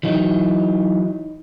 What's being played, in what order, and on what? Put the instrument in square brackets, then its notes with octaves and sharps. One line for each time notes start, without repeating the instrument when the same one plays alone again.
[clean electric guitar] E3 F#3 D#4